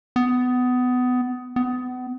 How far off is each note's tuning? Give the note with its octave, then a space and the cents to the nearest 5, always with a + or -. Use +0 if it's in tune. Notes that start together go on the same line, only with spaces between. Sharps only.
B3 +20
B3 +30